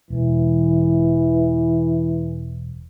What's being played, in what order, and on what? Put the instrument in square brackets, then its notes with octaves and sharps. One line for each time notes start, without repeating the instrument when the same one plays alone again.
[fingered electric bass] E1 [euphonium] E3